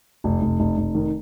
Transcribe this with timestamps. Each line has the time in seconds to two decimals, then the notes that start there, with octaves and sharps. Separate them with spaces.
0.24 F1
0.42 F1
0.60 F1
0.78 F1
0.95 D#3